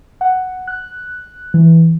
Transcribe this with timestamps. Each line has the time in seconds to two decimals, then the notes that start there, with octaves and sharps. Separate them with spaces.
0.21 F#5
0.67 F#6
1.54 E3